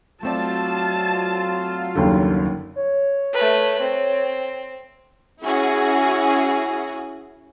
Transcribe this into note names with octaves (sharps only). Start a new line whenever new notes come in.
F#3 A3 C4 F4 D5 A5
F#1 D#2 D3 G3 A4
C#5
A3 B4
C4
C#4 E4 F#4 G#4